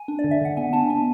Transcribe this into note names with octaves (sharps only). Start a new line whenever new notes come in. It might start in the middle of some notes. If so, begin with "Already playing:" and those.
Already playing: G#5
D4
D5
D3
E5
D3 F#5
B3 G#5
D4 A5
B3 G#5